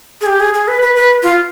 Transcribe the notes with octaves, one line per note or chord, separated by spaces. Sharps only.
G#4
G4
G#4
G#4
B4
B4
B4
F4